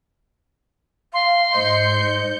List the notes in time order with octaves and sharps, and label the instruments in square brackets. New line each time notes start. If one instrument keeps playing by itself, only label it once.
[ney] F5 [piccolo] C6
[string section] G#2 G6 C#7 [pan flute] C5 [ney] D#5